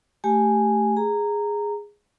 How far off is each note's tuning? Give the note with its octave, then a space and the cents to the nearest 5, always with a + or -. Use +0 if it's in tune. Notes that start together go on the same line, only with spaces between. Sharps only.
A3 +0 G4 +0 G#5 +0
G#4 -10 A#5 -10